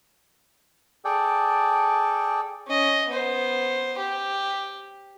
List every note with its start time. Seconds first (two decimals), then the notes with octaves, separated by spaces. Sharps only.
1.05 G#4 A4 D5 G5
2.67 C#4 D#5
3.09 B3 C5
3.98 G4